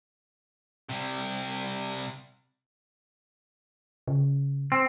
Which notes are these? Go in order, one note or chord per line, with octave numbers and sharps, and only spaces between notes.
C3 G3
C#3
C4